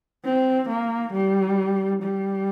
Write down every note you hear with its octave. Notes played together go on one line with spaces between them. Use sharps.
C4
A#3
G3
G3